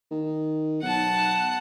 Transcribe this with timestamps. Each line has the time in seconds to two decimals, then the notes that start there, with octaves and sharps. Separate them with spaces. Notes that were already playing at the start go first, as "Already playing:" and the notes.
0.11 D#3
0.82 B1 F#5 A5